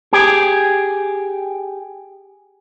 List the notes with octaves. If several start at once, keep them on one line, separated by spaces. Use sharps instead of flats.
G4 G#4